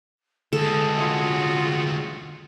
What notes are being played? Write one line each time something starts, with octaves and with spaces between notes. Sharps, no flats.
D2 G#3 G#4 A4
F4 F#4